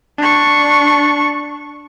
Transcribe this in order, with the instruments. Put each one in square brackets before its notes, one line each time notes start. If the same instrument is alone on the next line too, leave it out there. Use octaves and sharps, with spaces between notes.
[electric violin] D4 C#6